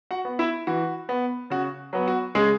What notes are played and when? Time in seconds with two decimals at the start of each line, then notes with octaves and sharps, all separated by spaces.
0.11 F#4 F#5
0.25 B3
0.39 E4 E5
0.67 E3 F#4
1.09 B3
1.50 C#3 F#4
1.93 F#3 B3
2.08 F#4
2.35 C#3 G#3 G#4